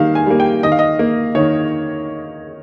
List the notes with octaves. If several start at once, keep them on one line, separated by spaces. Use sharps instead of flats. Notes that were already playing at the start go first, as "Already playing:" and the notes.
Already playing: D#3 G3 A#3 F5
G#5
G3 A#3
G5
D#3 D#5
F5
D#5
A#3
D#3 C#5